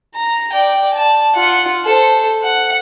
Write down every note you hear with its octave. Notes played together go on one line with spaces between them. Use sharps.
A#5
D5 G5
A5
F4 F#5
A4 C5
F#5